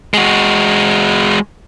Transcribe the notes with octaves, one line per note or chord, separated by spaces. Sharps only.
G#3 F#4